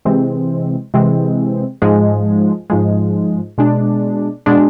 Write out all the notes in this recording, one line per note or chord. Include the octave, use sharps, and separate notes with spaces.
C3 E3 G#3 C4
C3 E3 G#3 C4
G#2 F3 G#3
G#2 F3 G#3
B2 G#3 D4
B2 G#3 D4